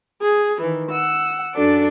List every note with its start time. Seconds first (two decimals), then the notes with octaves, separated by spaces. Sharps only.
0.22 G#4
0.61 D#3 E3
0.91 F#5 E6
1.55 F#2 D4 F#4 A4 D5